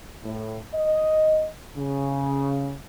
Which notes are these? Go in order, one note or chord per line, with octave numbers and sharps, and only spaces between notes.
A2
D#5
C#3